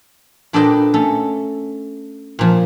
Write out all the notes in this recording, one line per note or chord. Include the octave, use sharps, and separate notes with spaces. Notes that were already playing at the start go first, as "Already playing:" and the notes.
A#2 D4 A4 B4 D#5 G5
A3 C#4 A4
A#2 F3